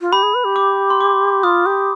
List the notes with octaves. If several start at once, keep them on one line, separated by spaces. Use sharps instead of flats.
F4
G4 B5
G#4
B4
G4
D6
C6
D6
F4 D#6
G4